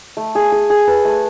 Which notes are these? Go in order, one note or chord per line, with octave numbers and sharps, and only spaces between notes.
A3
G#4
G#4
G#4
B4
A3